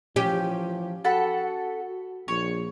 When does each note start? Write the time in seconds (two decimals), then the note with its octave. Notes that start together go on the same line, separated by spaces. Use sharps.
0.16 E3 F3 C#4 G4
1.04 F#4 A4 F#5 B5
2.28 A#1 C#5